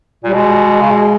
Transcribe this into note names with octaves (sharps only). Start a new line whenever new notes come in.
A#2 G3
B2 G#3
C#3
B2